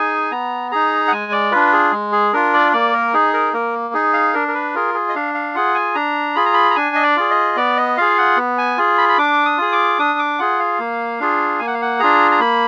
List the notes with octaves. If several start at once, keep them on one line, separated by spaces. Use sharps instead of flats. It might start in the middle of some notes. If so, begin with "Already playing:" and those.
Already playing: D#4 G#4 G#5
B3 A#5
D#4 G#4 A#5
F#5
G#3 G#5
D5
D4 F4 B4
G#4
G#3
G#4
D4 F4 A#4
D5
A#3 D5
A#4
D#4 G#4
A#4
A#3 A#4
D#4 G#4
F5
D4 A#4
A#4
B4
F4 G#4 A#4
G#4
D#5
D4 F5
F5
F4 G#4 F#5
G#5
D4 A#5
F4 G#4 B5
A#5
B5
A#5
D4 G#5
D#5
D5
F4 G#4
D#5
B3 D5
D#5
F4 G#4 F5
F#5
B3
G#5
F4 G#4
B5
B5
D4 D6
D#6
F4 G#4
D6
D4 D#6
D6
F4 G#4 F#5
F5
A#3
D4 F4 G#4
A#3 G#5
F#5
F5
F#5
D4 F4 G#4 A#5
A#5
A#3 B5